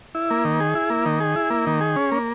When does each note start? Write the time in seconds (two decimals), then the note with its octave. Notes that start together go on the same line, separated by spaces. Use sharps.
0.15 E4
0.30 A#3
0.45 D#3
0.60 G#4
0.75 E4
0.90 A#3
1.06 D#3
1.20 G#4
1.36 E4
1.50 A#3
1.67 D#3
1.81 G#4
1.96 C#4
2.12 A#3